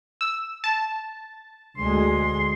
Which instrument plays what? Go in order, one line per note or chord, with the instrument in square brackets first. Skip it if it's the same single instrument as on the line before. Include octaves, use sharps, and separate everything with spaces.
[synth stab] E6
A5
[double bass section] D2 G#3 [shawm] C6